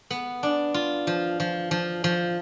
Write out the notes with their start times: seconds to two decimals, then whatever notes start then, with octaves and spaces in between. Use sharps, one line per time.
0.11 B3
0.43 D4
0.74 F4
1.07 F3
1.40 F3
1.71 F3
2.04 F3